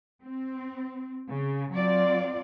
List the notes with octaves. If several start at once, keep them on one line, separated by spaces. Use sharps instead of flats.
C4
C#3
F#3 C4 F4 D5